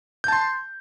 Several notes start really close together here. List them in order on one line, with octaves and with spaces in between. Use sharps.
G6 A5 C6